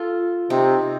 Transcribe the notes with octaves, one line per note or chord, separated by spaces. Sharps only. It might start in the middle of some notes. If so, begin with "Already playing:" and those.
Already playing: F4 A4
C3 D#4